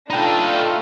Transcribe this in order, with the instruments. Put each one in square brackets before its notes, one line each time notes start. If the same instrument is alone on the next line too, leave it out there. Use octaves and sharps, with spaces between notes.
[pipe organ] A3 F4 [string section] D4 [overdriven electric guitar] D#4 A4 [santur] G5 B5